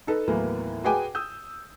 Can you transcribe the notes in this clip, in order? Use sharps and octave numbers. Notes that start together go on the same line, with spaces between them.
D#4 A4 B4
D#2 A2 E3 F#3 A#3 B3
F#4 G#4 B4 G5 G#5 D6
D#6 E6 G6